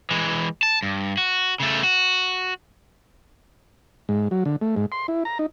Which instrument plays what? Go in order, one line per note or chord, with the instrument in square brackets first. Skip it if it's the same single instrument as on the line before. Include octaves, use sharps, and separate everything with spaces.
[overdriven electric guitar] E3 G#3
A5
G2
F#4
C#3 A3
F#4
[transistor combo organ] G#2
F#3
D3
A3
G#2
C6
E4
A#5
D#4